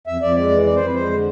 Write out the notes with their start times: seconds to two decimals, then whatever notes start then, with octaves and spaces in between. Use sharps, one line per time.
0.07 F2 E5
0.21 F2 D5
0.36 G#3 D5
0.51 E3
0.66 F2 D5
0.76 C5
0.81 F2 B4
0.94 G#3 C5
1.11 D3